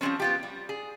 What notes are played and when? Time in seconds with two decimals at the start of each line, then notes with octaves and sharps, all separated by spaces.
0.01 F3 G3 G#3 C4 C#4
0.20 B3 F4 G4
0.43 G3
0.69 G#4